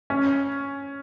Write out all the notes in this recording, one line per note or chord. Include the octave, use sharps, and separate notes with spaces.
C#4